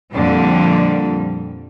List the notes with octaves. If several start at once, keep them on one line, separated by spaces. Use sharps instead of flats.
F2 A#2 D3 G3